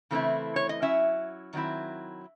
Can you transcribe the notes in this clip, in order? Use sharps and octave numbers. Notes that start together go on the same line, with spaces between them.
C#3 E3 A3 C4 E4
C#5
D#5
F#3 C#4 E4 E5
D#3 F#3 C4 E4